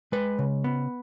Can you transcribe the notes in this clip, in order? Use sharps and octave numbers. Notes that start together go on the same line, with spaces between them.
G#3 B4
C#3
B3